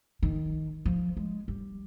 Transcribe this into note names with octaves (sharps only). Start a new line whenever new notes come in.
D#3
F3
G#3
G3